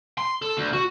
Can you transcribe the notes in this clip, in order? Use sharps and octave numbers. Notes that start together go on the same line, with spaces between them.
C6
A4
D2
F#4